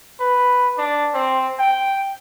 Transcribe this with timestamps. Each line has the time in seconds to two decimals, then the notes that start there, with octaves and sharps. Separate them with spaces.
0.20 B4
0.78 D4
1.14 C4
1.59 G5